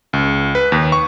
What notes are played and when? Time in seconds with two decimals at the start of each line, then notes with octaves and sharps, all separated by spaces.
0.13 C#2
0.55 B4
0.72 D#2
0.92 C#6